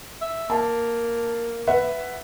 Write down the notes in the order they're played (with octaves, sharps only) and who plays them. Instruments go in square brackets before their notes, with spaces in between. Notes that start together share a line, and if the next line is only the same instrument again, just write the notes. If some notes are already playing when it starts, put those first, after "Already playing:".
[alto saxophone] E5
[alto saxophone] A#3 [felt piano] A5
[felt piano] B4 E5 F#5